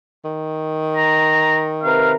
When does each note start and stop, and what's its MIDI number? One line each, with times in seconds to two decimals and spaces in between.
0.25 2.15 51
0.97 1.68 82
1.83 2.13 48
1.83 2.13 70
1.83 2.13 71
1.83 2.12 77